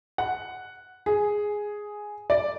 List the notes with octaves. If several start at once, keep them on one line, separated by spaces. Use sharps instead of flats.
F#5
G#4
D5